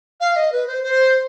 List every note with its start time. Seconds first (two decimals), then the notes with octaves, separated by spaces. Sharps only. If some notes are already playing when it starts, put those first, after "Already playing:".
0.21 F5
0.36 D#5
0.52 B4
0.67 C5
0.83 C5